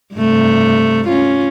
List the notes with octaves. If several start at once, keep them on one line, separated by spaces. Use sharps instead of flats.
G2 C3 A3
C#4 F4